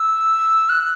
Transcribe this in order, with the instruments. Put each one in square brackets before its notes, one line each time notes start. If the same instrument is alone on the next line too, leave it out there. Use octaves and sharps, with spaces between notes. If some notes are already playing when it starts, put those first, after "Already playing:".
Already playing: [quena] E6
F#6